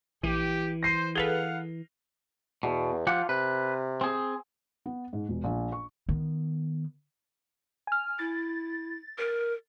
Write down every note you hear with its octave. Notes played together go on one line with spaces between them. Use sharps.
A#1 E3 G4 D#7
C5 A#6 C7 D#7
G#4 A4 B4 F5 F#5 F7 G7
E2 B2
F3 F4 G4 F#5
C3 B4
C4 G#4
B3
G#2
E1
A#1
C#6
D#3 B3
G#5 F6
E4 A6
A#4